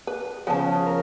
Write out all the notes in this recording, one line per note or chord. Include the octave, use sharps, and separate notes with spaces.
B4
C#3 F3 B3 G#5 A5
A#4